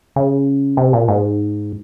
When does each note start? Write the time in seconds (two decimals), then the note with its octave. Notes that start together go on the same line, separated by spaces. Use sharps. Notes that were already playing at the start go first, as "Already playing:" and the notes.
0.16 C#3
0.77 C3
0.93 A#2
1.08 G#2